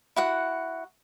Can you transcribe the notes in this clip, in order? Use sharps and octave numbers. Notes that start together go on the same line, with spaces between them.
E4 F#4 F#5